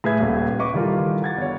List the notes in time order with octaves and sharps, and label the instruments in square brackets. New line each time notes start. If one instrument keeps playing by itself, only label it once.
[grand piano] A2 G#4 B4 E5 G#6
D#1 D#2 G3
B4 D#5 C#6 D6
D#3 E3 G3 F4 A4 A#4
F#5 G#6 A6
G1 C#5